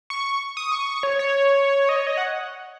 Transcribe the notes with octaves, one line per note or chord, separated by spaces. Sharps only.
C#6
D#6
C#6
C#5
C#5
D#5
C#5
D#5
F#5